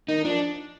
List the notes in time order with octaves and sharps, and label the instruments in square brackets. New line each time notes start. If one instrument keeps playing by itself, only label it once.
[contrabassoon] D#3 [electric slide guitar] D#4
[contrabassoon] F3 [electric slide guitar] D4